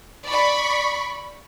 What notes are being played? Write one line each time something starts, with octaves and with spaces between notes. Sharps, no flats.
D5 B5 C#6